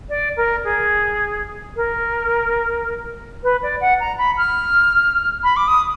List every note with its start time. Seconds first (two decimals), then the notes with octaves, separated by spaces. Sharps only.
0.09 D5
0.36 A#4
0.64 G#4
1.76 A#4
3.43 B4
3.62 D5
3.81 F#5
4.00 A#5
4.18 B5
4.37 F6
5.43 B5
5.56 D6
5.67 D#6